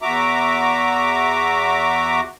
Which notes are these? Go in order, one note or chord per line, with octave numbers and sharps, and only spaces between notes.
E2 F#4 E5 A#5 D6